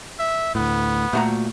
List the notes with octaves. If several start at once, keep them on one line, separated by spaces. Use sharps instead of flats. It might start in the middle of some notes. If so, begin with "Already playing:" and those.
E5
D2 A2 B3
A#2 A3 F#4 A#5